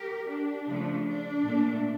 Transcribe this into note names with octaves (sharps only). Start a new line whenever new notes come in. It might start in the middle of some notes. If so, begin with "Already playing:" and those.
Already playing: G4 A#4
D4
C#3 F3 A3
D4
A#2 A3